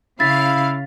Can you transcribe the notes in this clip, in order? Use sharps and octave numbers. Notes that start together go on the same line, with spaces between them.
C#3 E4 F5 A6 B6